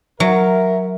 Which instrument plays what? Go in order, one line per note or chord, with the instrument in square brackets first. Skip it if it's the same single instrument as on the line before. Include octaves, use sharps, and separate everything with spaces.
[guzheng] F#3 [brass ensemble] A#4 [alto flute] E5